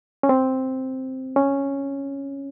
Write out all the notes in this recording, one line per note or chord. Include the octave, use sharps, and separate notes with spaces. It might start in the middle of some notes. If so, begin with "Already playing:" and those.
C#4
C4
C#4